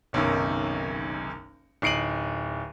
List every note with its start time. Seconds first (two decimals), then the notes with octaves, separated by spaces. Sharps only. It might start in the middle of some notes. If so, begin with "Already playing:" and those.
0.13 F#1 B1 F#2 C3 D#3
1.82 D1 D#4 C7 D7 D#7 F#7